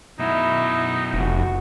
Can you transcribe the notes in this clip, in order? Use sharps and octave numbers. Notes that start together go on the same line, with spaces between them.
F#2 B2 D#4 E4
F1 F#4